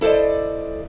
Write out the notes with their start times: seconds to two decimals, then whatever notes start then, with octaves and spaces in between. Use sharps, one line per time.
0.01 E4 A4 C5 D5 D#5